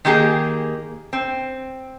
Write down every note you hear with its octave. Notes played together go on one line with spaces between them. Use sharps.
D#3 A#3 G4 G#4
C4